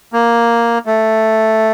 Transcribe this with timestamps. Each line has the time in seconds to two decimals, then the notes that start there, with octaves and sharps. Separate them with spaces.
0.13 A#3
0.86 A3